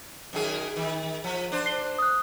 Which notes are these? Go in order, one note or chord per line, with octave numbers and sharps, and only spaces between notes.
F#2 D#3 G#4
D#3
F3
D4 C5
C7 G7
D#6 F#6